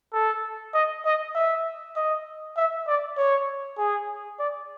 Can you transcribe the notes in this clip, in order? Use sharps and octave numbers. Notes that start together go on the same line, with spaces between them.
A4
D#5
D#5
E5
D#5
E5
D5
C#5
G#4
D5